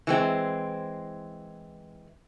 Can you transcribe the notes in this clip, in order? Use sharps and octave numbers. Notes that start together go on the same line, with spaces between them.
E3 G#3 C4